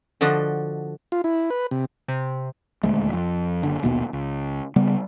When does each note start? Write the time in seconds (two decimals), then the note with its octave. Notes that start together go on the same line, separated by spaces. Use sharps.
0.21 D3 F3 D4 F#4 D#5
1.12 F4
1.24 E4
1.50 B4
1.71 C3
2.08 C3
2.83 D#1 D2 G#3 A3
3.13 F2
3.63 F#1 D3
3.83 A#1 D#2 B2 B3
4.13 C#2
4.76 C#3 G3 B3